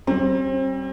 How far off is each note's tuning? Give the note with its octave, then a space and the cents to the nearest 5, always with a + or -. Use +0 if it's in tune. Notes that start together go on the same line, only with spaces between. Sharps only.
G3 -30 C4 +30